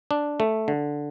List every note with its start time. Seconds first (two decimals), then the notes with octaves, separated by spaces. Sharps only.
0.11 D4
0.40 A3
0.68 D3